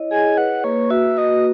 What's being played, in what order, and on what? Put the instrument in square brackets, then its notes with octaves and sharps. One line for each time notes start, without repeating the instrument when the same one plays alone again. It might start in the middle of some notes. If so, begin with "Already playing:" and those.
Already playing: [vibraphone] E4 C#5 D#5
[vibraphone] G#4 [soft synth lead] G#5
[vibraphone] B4 [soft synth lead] F#5
[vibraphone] A#3 [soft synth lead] C#5
[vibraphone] F#4 [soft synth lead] E5
[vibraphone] F#4 [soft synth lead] D#5